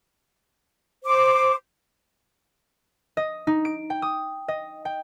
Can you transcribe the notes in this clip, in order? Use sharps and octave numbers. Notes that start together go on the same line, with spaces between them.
C5 D6
D#5
D#4
D7
G5
D#6
D#5
G5